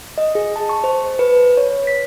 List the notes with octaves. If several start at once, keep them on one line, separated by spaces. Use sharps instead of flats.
D#5
G#4
A5
C#6
C5
B4
C#5
B6